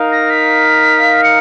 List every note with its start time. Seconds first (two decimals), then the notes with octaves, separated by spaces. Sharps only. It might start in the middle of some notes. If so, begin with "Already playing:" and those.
Already playing: D#4 A#4 F5
0.11 A#6
0.30 B6
1.23 C#7